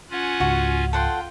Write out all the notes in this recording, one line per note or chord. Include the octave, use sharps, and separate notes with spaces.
C#4 F4 F#5 G#5
C#2 G#2 F#4
F4 A4 F#5 G5 C6